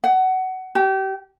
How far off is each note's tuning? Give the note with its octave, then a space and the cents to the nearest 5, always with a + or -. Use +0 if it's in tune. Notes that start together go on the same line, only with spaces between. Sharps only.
F#5 +20
G4 -30